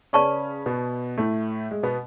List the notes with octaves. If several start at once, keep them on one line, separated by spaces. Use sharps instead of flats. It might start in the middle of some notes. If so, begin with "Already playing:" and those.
C#3 C#4 B4 D5 A5 C#6
B2 B3
A2 A3
G#3
B2 B3